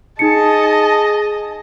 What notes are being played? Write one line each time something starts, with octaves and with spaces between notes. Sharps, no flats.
D#4 G#4 D#5 A5 C#7